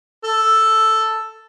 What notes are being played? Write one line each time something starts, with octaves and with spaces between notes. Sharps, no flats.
A4